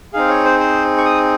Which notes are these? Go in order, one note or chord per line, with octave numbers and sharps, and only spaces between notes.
C4 D#4 G#4 F5
C#5
C5
C5
C#6
D#6